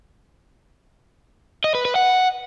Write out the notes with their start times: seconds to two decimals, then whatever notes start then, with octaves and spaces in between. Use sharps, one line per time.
1.64 D#5
1.75 B4
1.85 B4
1.95 F#5